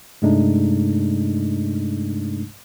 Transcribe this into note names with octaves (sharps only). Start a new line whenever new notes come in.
G2 C3 G#3 A3 D4 D#4